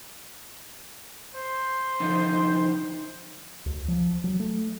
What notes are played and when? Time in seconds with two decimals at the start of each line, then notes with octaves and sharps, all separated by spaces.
1.35 C5
2.00 D3 F3 D#4
3.66 D2
3.88 F3
4.24 F#3
4.40 A3